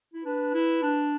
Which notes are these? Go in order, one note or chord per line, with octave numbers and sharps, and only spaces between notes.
E4
D4 B4
E4
D4